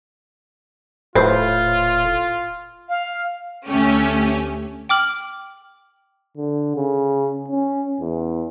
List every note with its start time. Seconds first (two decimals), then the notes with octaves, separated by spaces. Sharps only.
1.15 D#1 A2 F4 B4 C5
2.89 F5
3.68 D2 A3 C#4 G4
4.89 G5 D6 F6 F#7
6.37 D3
6.76 C#3
7.48 C#4
8.00 E2